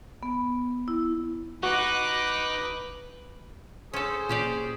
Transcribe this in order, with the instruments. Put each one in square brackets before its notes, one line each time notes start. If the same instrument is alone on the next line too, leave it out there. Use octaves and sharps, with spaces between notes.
[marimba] B3
E4
[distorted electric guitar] D#4 [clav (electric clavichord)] F#4 [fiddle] B4 [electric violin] D6 F#6
[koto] C#4 A4 [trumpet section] G#4 C5
[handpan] A#2 [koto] C#4 G4 D5